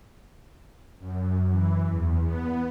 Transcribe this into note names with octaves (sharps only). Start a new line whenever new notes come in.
F#2
E3
E2
B3